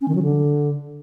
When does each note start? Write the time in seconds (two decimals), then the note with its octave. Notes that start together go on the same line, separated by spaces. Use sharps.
0.01 C#4
0.08 D#3
0.15 F#3
0.22 D3